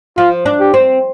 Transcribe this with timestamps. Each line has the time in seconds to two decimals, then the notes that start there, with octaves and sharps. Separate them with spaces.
0.17 F3 F4
0.46 D4
0.60 G4
0.74 C4